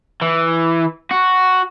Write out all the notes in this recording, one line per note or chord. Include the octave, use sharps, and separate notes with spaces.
E3
F#4